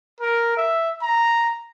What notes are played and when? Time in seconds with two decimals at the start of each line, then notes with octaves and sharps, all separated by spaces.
0.21 A#4
0.57 E5
1.02 A#5